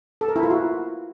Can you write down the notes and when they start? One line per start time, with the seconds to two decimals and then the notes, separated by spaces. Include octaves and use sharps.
0.21 A4
0.28 A#4
0.36 E4
0.43 F4
0.50 F#4